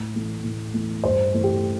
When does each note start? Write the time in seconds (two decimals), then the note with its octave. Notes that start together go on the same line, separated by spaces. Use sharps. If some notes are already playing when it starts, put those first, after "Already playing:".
Already playing: A2
0.14 E3 A3
0.44 A2
0.74 E3 A3
1.04 G2 C5
1.34 E3 A3
1.44 G4